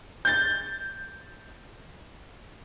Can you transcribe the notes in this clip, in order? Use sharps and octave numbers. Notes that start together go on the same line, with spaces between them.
G6 A6